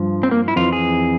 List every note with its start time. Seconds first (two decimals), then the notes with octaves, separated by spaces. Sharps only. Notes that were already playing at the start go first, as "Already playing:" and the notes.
Already playing: G2 F3
0.23 C4
0.31 A#3
0.48 E4
0.56 F2 E3 F4
0.73 G#4